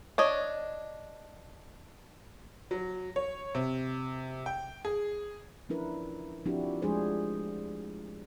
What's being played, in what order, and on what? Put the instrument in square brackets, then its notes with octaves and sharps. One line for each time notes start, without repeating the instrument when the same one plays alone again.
[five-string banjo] D4 C#5 D#5
[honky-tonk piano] F#3
C#5
C3
G5
G#4
[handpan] F3 C#4 D4 E4 A#4 B4
F3 C4 D4 E4 F#4 G4
F3 G#3 A3 D4 G#4 C5